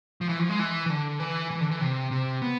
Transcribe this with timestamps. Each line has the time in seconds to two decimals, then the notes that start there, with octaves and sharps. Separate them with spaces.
0.21 F3
0.29 E3
0.39 F3
0.49 G#3
0.59 E3
0.86 E3
0.90 D3
1.20 E3
1.51 E3
1.61 D3
1.71 E3
1.81 C3
2.11 C3
2.42 B3